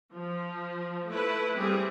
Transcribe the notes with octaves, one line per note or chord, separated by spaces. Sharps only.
F3
A3 E4 B4
G3 C4 G#4